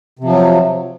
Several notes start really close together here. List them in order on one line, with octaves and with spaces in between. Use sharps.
C3 F3 F#3